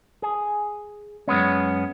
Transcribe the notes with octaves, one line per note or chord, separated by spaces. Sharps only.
G#4
F#2 G#3 B3 C#4